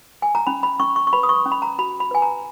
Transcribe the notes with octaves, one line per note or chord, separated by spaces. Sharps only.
G#5
A#5
C#4 B5
B5
C#4 C#6
C#6
C#6
B4 B5
D#6
C#6
C#4
B5
A#5
F#4 B5
B5
B4 G#5
A#5